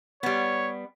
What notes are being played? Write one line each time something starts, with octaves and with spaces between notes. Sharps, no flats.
G3 B3 C#5